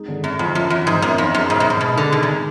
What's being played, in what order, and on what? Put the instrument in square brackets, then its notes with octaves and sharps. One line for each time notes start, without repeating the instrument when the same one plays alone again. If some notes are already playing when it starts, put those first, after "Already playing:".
Already playing: [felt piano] G#3 D#4
D3
[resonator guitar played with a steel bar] F#2 [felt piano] D3
[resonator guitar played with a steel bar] F2 [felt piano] F3
[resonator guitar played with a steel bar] F#2 [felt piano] F4
[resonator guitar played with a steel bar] F#2 [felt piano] F3
[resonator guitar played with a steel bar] G#2 [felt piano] F3
[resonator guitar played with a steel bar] F#2 [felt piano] B3
[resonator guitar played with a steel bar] F2 [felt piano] D#4
[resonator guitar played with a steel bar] F#2 [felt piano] G#4
[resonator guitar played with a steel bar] G#2 [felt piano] B2
[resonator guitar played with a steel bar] F#2
[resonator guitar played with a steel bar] G#2 [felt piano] G#3
[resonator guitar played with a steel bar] B2 [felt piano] D#4
[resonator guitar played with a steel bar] D3 [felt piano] G#4
[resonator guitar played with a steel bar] B2 [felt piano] D#3
[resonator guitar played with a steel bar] A#2
[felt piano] G#3